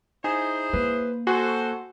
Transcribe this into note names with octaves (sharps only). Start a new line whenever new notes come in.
D#4 E4 G#4 C5 G#5
A#3 B4
F#4 A4 C5 G#5 C6